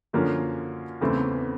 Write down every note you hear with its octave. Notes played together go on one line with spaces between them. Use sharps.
F#2 D3 F3 A#3 C#4
E2 C#3 E3 A3 C4